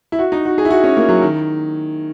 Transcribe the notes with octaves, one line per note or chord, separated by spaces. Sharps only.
E4
F#4
D#4
F#4
G#4
E4
F#4
C#4
A#3
F#3
D#3